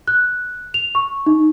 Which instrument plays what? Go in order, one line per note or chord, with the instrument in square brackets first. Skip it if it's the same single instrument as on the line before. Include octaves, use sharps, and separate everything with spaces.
[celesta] F#6
F7
C#6
D#4